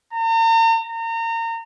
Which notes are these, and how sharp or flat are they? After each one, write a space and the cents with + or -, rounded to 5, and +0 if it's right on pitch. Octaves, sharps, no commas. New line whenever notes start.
A#5 -40
A#5 -30